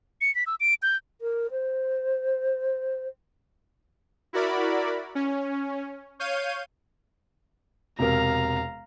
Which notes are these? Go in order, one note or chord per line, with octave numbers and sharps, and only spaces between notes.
C#7
B6
E6
D7
G6
A#4
C5
E4 F#4 A#4 D5 B5
C#4
C#5 F5 G6 D#7
E1 C3 A#4 F5 A#5